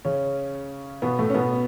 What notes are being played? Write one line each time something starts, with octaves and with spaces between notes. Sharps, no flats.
C#3 C#4
B2 B3
A2 A3
C#4
B2 B3